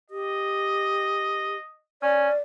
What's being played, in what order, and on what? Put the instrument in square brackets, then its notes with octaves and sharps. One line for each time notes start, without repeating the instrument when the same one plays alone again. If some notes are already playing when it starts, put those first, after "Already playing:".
[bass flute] G4 [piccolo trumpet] D#5
[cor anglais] C#4 [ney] D5